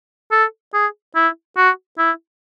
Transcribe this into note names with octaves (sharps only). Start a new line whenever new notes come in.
A4
G#4
E4
F#4
E4